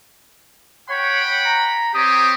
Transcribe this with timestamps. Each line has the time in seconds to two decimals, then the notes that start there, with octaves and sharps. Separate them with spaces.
0.90 C#5 F#5 G5 B5
1.45 A#5
1.94 C4 G4 C#5 D#6